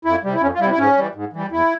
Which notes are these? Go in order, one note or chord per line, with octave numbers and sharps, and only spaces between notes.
F2 E4
C3 G3
E4
F2 C#4
F4
C3 G3 E4
E4
G#2 C#4
E3 G3
G#2
E3 G3
E2 E4